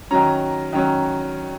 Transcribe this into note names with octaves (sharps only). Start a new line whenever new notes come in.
D#3 F#3 C#4 A#5
D#3 F#3 C#4